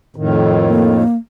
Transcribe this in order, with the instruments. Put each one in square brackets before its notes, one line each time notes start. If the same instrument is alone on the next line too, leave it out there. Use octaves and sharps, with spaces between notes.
[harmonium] F2 A2 D#3
[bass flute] A#3